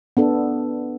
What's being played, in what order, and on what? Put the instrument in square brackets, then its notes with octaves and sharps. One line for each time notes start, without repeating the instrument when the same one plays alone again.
[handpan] B3 D4 A4